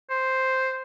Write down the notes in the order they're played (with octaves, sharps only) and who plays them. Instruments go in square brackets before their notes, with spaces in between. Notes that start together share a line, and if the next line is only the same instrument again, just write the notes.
[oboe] C5